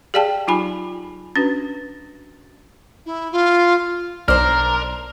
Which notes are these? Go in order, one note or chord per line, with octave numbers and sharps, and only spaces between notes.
G4 G#4 D5 F5 G5 A5
F#3 D#4 F4 G#5 B5
C#4 D4 F#4 B4
E4
F4
B1 D4 A#4 C5 F6